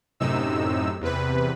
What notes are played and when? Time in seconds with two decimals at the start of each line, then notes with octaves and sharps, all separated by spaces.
0.20 F#2 A2 C3 D#4 E6
1.00 E2 C3 B4